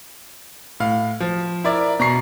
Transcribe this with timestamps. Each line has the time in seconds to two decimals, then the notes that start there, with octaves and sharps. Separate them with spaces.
0.80 A2 F5
1.20 F3
1.64 E4 A#4 D5
1.99 B2 A#5 C#6 C7